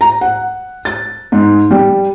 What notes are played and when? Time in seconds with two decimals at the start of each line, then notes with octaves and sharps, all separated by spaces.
0.01 A#5
0.21 F#5
0.85 A6
1.32 G#2
1.71 G3